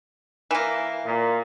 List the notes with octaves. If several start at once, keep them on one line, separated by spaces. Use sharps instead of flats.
E3 A#3
A#2